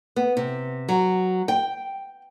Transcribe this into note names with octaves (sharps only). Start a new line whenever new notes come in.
B3
C3
F#3
G5